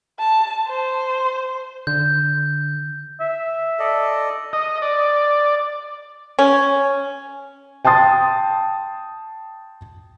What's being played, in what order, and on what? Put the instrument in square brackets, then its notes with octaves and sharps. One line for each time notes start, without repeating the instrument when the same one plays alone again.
[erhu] A5
C5
[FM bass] D3 [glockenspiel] G6
[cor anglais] E5
[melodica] A4 D5 D#5
[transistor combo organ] D#5
D5
[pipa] C#4
[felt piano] G5 A5 C6 D#6 A6